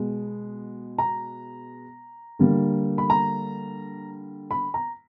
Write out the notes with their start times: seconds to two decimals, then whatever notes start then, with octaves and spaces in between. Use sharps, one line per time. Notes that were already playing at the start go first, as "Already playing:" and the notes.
Already playing: B2 G#3 B3
0.98 A#5
2.39 D3 G3 A#3
2.98 B5
3.10 A#5
4.51 B5
4.74 A#5